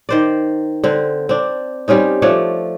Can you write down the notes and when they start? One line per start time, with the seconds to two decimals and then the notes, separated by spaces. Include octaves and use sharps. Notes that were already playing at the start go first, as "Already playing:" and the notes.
0.09 D#3 C5 D5
0.84 D3 C4
1.29 C4 D4
1.88 G3 C4 C#4 D#4
2.22 F3 A3 D4 C#5